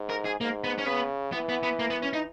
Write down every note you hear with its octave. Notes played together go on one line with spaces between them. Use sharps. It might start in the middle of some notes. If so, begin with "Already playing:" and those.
Already playing: G#2
A#4
G#4
G#2 A#3
B3
C#4
C#3 B3
E3 B3
B3
B3
A#3
B3
C#4
D#4